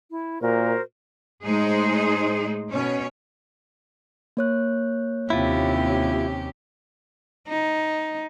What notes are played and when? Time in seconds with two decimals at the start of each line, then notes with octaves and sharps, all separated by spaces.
0.11 E4
0.41 A#2 F#4 A#4 C5
1.44 A2 G#3 D#4 G#4 C5
2.70 B2 C#4 C#5
4.37 A#3 C#5 F#6
5.30 D#2 C3 C#4 E4 F4 G4
7.48 D#4